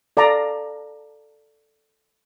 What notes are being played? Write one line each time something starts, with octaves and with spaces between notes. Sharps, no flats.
A4 D5 F5 A#5